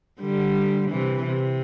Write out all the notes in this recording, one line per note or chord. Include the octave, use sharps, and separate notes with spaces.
D3 G3
C3 E3
C3